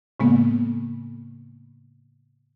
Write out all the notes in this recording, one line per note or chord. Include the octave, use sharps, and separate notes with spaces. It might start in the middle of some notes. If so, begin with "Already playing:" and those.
A2 C#3 G#3 A#3 B3